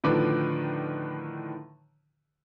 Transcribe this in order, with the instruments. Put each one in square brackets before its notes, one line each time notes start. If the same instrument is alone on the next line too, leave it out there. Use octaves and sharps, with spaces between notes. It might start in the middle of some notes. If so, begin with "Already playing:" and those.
[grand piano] A2 D3 D#3 F3 B4 D6